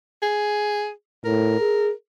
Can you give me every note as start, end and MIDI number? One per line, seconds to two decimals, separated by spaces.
0.22 0.90 68
1.25 1.55 45
1.25 1.91 70
1.60 1.91 68